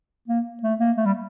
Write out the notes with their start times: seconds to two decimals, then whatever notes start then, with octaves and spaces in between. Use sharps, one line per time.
0.28 A#3
0.63 A3
0.79 A#3
0.97 A3
1.06 G3